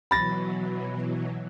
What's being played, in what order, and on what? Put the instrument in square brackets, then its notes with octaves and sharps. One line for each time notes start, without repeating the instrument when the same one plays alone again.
[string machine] B2 E3 F#3 [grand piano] B5 A6 A#6